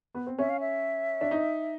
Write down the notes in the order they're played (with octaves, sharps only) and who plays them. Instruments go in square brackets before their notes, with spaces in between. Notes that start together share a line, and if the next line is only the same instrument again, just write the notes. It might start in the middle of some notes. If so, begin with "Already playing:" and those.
[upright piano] B3
C4
[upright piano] C#4 [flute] E5
[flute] F5
E5
[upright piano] D4
D#4